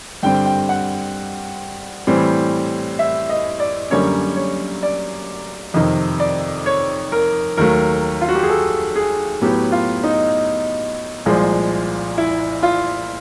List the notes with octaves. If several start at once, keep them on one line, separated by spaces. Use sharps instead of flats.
G2 D3 G3 C4 G5
G5
F#5
A2 E3 G3 C4
E5
D#5
D5
F#2 D3 G3 A#3 C#4 C#5
C#5
D5
F2 C3 D#3 D#5
D5
C#5
A#4
D#2 D#3 F#3 A3 A#4
F4
F#4
G4
G#4
A4
G#4
A2 F#3 B3 G4
F4
D#4
C2 A#2 F3 G#3
E4
F4